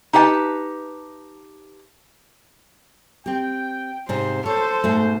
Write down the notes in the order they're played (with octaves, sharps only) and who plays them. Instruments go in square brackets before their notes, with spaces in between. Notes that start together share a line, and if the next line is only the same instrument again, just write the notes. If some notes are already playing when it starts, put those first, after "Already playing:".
[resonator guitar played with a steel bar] D#4 G4 B4 F#5 A5
[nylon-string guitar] C4 G4 [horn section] G5
[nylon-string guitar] G#2 C3 [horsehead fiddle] C5
[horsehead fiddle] A4 [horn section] C5 [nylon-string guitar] C#5
[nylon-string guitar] G#2 B2 A3